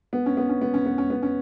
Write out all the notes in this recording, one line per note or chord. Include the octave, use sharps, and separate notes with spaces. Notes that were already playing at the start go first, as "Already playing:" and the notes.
B3
C#4
B3
C#4
B3
C#4
B3
C#4
B3
C#4